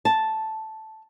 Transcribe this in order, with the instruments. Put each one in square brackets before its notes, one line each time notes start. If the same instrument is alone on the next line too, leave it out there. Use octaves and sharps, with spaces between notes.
[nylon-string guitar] A5